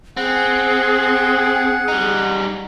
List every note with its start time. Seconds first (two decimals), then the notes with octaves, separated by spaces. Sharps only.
0.17 C4 G#4 F#5
1.88 G3 D#4